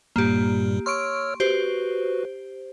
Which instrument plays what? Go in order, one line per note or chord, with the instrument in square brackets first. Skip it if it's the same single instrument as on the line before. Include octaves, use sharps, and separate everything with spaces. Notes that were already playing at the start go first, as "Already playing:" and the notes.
[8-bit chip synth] G2 A#2 G3 [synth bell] A#3 G4
[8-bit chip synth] C#5 E6 F6 [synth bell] C6 C#6 D7
[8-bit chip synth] F#4 B4 [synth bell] G4 C5